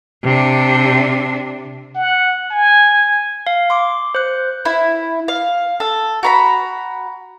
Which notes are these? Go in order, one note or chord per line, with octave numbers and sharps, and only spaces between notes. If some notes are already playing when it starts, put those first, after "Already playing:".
C3 D4
F#5
G#5
F5
C6 D6
C5 F#6
E4
F5
A4
F#4 A#5 B5